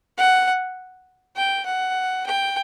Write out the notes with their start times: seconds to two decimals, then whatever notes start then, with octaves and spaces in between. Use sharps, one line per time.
0.18 F#5
1.37 G5
1.66 F#5
2.26 G5